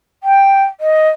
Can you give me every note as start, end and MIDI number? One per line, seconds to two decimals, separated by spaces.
0.23 0.64 79
0.80 1.09 75